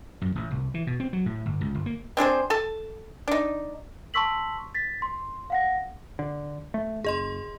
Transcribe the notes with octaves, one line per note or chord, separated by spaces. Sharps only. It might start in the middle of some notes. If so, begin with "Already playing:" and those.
F#2
A1
C2
E3
B2
C4
F#3
A2
G1
C#2
G1
A#3
C4 D4 G#4 C5
A4 A5
D4 D#4
A5 C6 C#6 E6 B6 F#7
A6 B6
C6
F5 F#5 A#6
D3
A3
F#1 G#4 D#5 C6